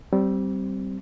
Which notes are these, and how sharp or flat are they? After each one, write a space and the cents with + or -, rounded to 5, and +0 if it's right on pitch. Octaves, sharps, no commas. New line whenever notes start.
G3 -20 C4 +0